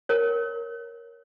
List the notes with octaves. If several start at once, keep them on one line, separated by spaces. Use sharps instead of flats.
A#4 C#5